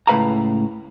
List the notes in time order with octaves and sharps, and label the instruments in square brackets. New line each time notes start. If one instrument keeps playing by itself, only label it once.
[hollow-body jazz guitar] C#2 A2 B4 F5 A#5